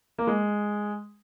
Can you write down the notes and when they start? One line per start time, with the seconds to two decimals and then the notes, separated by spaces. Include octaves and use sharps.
0.18 A#3
0.27 G#3